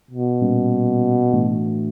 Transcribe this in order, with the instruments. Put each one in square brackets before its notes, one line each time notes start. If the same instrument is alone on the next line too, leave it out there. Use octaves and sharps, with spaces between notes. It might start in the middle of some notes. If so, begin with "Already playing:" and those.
[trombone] B2
[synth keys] A#2 G3 A#3 C#4
A2 E3 A3 D4 F#4